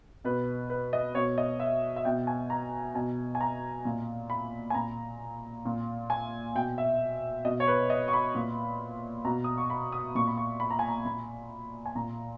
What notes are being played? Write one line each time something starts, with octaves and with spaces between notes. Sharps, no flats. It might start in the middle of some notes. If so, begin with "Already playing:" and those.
B2 B4
B4
D#5
B2 C#5
D#5
E5
E5
B2 G5
G#5
A#5
B2 G#5
G#5
A#5
A#2
B5
G#5
A#2 A#5
A#2
G#5
B2 G5
E5
B2 D#5
C#5
B4
D#5
C#6
B5
A#2
B2 A#5
D#6
C#6
B5
D#6
A#2 C#6
B5
C#6
B5
A#5
G#5
A#5
A#2 B5
G#5
A#2 A#5